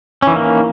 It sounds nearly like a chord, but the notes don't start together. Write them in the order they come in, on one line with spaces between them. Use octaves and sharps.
C#4 E3 D#3 A#3